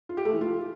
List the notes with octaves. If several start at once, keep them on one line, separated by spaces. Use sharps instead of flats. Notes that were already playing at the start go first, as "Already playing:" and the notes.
F4
G4
A3
E3
F4